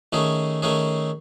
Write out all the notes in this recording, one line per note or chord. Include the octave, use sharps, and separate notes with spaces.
D#3 A3 C#4 G#4
D#3 A3 C#4 G#4